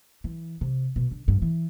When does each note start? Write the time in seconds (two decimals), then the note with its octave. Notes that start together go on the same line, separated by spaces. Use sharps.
0.24 E3
0.61 C3
0.96 B2
1.11 D3
1.28 G2
1.42 E3